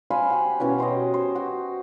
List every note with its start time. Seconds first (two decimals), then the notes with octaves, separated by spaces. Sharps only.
0.10 C5 F5 G#5 B5
0.30 G4 F#5
0.59 B2 E3 C#4 F#5
0.79 G4 C5 C#5 D#5
1.14 C5
1.35 F#4